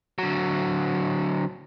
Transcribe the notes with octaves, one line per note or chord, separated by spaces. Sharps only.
D3 F#3